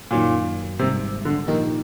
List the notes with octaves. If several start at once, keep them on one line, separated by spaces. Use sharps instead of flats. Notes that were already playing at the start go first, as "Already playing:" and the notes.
F#2 A#2 D#3 F#3 A#3
G#1 G#2 C3 D#3 G3
D3
A#2 D#3 F3 A#3 D#4 G4